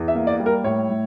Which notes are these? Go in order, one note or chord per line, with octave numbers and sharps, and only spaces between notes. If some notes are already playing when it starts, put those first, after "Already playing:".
Already playing: E2
E5
A#3
D5
G3
A#4
A2 C#5
A2